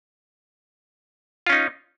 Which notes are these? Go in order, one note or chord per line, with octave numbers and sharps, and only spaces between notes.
C#4 D#4 F4